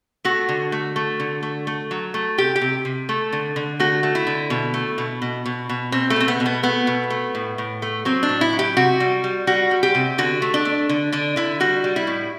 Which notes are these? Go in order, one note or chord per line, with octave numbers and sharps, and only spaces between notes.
A3 F#4
D3
A3
A3
D3
A3
A3
F#3
A3
C3 G4
G4
C3
C3
A3
D3
D3
A3 F#4
A3
E4
D3
B2
A3
B2
B2
B2
B2
B2 C4
A3
B2 C4
B3
B2
B3
A3 B3
B2
A3
A2
A2
A3
F#3 C4
D4
A2
E4
F#3
G4
C3 F#4
G3
G3
G3 F#4
G3
G4
C3
D3 F#4
A3
D4
A3
D3
D3 D4
D3 E4
G3 F#4
G3
E4
A2